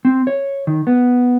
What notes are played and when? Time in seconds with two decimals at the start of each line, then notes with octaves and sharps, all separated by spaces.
0.05 C4
0.27 C#5
0.67 D#3
0.87 B3